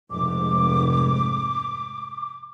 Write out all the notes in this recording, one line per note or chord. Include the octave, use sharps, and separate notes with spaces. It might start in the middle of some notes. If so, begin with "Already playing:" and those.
F1 G#2 D6